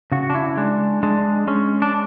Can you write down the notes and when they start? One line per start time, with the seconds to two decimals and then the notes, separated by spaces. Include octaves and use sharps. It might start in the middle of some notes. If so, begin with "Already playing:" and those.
0.12 C#3 F#4
0.30 D4
0.35 E4
0.57 G#3 D4
1.03 G#3 D4
1.47 G#3 C#4
1.82 D4